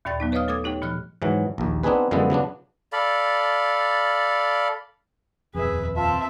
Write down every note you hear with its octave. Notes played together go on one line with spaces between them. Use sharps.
D#2 A#2 D5 G5 A6
F#3 B3 D#4
B4 C#5 D#5 F5 D#6 F6
A3 A4 D6 D#6 G#6
D#4 G4 C#5 G5
A#2 F3 F6 F#6
G#2 E3 F#3
A#1 D#2
B3 C4 D4 D#4 G#4 B4
F#2 D3 F3 G#3 B3 E4
C#3 F#3 B3 D4
A4 D5 F5 B5
D#1 F2 G#4 B4 E5
C4 F4 E5 A5